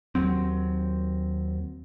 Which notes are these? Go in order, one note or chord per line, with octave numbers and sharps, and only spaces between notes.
D#2 F#3 C4